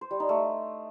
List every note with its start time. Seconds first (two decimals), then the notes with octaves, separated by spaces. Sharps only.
0.01 C5
0.11 G3
0.20 D#4
0.29 A3